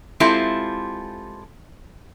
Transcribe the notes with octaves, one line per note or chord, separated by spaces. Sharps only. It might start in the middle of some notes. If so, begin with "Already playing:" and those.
G#3 C4 E4 F4 G4 A4